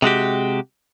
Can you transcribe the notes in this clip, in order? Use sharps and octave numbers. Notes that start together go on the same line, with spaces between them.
C3 G#3 F#4 G4